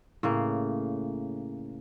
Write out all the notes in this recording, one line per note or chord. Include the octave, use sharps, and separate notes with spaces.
A2 C#3 A#3